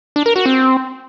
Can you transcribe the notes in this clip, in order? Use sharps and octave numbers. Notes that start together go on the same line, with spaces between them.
D4
A#4
F#4
C4